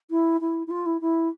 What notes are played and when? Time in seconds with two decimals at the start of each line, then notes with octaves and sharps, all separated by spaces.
0.11 E4
0.41 E4
0.67 E4
0.70 F4
0.86 E4
1.01 E4